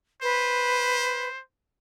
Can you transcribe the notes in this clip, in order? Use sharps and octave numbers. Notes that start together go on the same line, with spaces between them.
B4 C5